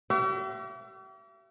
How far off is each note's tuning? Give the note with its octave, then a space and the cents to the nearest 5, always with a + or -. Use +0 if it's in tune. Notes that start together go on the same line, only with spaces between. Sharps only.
G4 -45 E5 +35